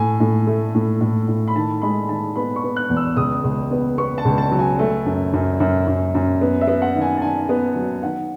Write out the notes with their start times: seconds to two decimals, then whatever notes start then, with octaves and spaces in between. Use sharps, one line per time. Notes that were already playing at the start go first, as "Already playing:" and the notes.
Already playing: A2 G#5
0.20 A2
0.47 A3
0.75 A2
1.01 A2
1.28 A2
1.48 B5
1.55 D#3 A5
1.82 G#3 B5
2.09 D#3 A5
2.36 B3 B5
2.56 C#6
2.64 B3
2.76 F#6
2.89 E2
2.97 E6
3.16 C#2 D#6
3.44 C#2
3.71 B3
3.98 B3 C#6
4.18 A5
4.25 C#2
4.38 A5
4.52 F#3
4.59 G#5
4.79 A3
5.06 F#2
5.33 F#2
5.60 F#2
5.87 F#2
6.14 F#2
6.41 B3
6.61 E5
6.68 B3
6.82 F#5
6.95 D#3
7.02 G#5
7.17 A5
7.22 D#3 G#5
7.49 B3
7.76 F#3
8.03 D#3 F#5